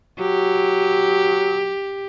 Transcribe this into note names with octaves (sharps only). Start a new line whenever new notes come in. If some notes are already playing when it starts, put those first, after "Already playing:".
F#3 G4